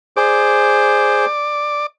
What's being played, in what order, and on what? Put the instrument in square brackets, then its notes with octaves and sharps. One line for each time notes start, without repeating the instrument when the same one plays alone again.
[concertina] G#4 C5 [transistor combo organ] D5 D6